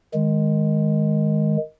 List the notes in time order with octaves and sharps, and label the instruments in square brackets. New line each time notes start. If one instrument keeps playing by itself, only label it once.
[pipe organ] D#3 G#3